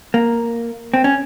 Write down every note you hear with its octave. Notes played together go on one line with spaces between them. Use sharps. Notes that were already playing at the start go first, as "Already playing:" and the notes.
A#3
C4
C#4